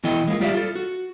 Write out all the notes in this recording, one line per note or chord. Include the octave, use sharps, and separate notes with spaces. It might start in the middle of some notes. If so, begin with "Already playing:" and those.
B2 E3 E4 A4 D#5 G5
G#3 A#3 B3 F4
G3 F4 G4 D5 E5 F5
F4 A4
F#4